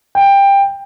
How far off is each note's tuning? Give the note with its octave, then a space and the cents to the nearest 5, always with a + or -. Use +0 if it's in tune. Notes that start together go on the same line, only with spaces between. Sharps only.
G5 +20